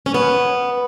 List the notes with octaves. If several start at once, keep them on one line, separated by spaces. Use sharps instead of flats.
C#4
B3